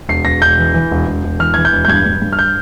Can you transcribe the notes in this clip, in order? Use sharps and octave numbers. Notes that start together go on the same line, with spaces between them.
E1 C7
E1 A#6
E1 G6
E3
E3
E1
E1
E1
E3 F6
E3 G#6
G6
E1
G6
G2 G#6
G2
G2
F6
G6